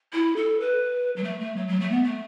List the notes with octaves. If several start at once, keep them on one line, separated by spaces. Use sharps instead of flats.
E4
A4
B4
F#3
A3
A3
F#3
F#3
A3
B3
A3